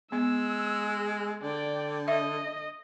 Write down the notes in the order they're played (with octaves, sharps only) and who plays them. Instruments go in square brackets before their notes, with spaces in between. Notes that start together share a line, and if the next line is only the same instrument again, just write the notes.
[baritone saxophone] G#3 [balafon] B3 [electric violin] E6
[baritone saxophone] D3 [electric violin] D5 G5
[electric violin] D#5 [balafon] E5